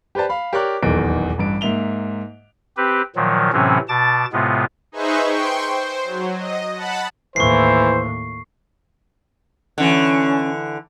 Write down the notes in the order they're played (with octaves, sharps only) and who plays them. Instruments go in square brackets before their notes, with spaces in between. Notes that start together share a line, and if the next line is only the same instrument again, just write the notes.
[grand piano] G4 B4 C5 D5 A5
F5 B5
G4 A#4 C#5 D5 D6 F#6
D#1 B1 E2 D#3 D7
A1 G2 D7
G#2 A#3 E5 F7 G7
[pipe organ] C4 G4 B4
A#2 D#3 F3 F#3
A2 C3 E3 F#3 C4 C#4
B2 A5 D6 A6
A2 C3 G#3 B3 F4
[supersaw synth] D#4 G#4 B4 C5 E5 C#6
G5 C6 C#6
C5
F#3
D#5
F#5 A5 B5
[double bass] D#2 A2 [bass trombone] E3 [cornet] C5 [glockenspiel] C#6 C7
[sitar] D3 E3 [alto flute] C#4